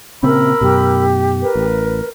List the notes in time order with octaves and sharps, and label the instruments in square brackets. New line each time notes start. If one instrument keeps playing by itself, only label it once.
[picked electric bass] A#2 C#3 C4 [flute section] A#4 B5 E6
[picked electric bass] F#2 B2 [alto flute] G4
[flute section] A#4 B4
[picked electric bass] A1